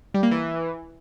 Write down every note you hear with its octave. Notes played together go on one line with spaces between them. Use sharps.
G3
A#3
E3